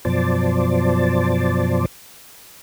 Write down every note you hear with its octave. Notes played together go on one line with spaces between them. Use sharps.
F#2 B2 F3 C5 D5 A5